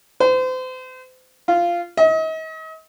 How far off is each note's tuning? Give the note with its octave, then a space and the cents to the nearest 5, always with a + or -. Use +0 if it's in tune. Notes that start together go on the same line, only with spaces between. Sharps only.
C5 -35
F4 -10
D#5 +40